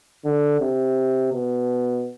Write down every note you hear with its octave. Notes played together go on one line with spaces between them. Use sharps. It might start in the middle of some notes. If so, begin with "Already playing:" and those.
D3
C3
B2